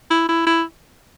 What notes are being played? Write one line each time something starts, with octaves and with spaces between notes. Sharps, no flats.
E4
E4
E4